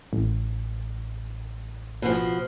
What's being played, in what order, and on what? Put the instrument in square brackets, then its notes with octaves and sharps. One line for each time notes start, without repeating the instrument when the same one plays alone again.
[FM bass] A1
[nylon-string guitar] B2 F3